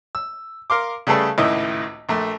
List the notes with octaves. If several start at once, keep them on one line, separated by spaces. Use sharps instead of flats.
E6
A#4 F5 C6 D6
C#3 G3 A3 G#4 A4 B4
G#1 C#2 A2 E4 D#5
A#1 A3